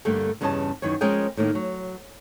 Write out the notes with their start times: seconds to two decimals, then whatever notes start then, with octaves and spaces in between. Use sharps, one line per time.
0.05 G2 D3 G3 A3 A#3
0.41 E2 G2 C#3 C#4 D#5 A5
0.82 F#2 D#3 E3 C#5
1.01 F3 G#3 C#4 A#4 D#5 G5
1.37 A2 D#3 A#3
1.55 F#3